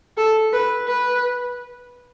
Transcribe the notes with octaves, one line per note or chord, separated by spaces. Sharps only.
A4
B4
B4